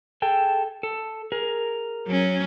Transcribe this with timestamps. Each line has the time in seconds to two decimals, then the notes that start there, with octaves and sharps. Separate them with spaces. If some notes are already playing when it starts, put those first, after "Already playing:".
0.22 G#4 A4 G5
0.83 A4
1.32 G#4 A#4
2.07 F#3 C#4